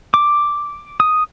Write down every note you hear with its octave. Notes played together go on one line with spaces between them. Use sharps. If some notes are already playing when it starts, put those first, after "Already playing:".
D6
D#6